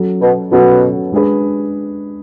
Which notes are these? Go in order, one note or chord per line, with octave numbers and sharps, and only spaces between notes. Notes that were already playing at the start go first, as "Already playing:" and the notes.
Already playing: F#3 C#4 F#4 A4
B2
B2 F#3 C#4 F#4 A4
G#3 D4 G#4 B4